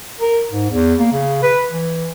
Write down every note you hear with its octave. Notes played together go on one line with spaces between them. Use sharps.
A#4
G#2
E2
A#3
C#3
B4
E3